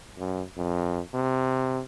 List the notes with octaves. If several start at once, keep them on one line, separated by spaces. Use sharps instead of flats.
F#2
F2
C3